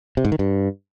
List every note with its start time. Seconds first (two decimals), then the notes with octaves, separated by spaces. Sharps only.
0.17 C3
0.25 G#2
0.32 D#3
0.39 G2